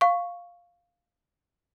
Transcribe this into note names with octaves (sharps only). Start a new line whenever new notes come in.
F5 C#6